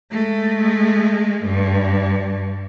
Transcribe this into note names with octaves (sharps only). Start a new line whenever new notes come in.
G#3 A3
G2